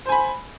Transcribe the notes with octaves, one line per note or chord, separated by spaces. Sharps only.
C5 G#5 B5